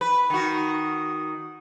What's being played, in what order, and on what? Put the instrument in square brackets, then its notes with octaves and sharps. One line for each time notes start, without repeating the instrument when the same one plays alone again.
[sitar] B4
D#3 F#4